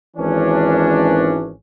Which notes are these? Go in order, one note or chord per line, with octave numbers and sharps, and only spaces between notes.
G#1 E3 C#4 D4